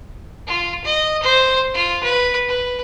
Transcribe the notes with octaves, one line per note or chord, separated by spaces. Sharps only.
F4
D#5
C5
F4
B4
B4